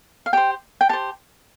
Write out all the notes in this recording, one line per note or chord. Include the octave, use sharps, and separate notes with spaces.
F5
G4 C5 G5
G5
G4 C5 A5